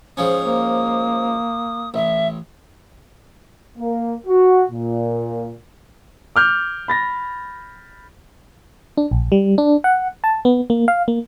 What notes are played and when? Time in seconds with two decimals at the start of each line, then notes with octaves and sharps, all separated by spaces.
0.17 G#2 F3 C#4 D#6
0.44 A#3
1.94 A1 E5
3.78 A#3
4.27 F#4
4.71 A#2
6.36 D6 F6 G6
6.88 B5 A6 A#6
8.97 D4
9.11 A#1
9.32 G3
9.58 D4
9.84 F#5
10.24 A5
10.45 B3
10.70 A#3
10.88 F5
11.08 A#3